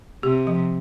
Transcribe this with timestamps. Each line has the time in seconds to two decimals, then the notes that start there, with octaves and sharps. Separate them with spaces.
0.23 C3 G4
0.47 F3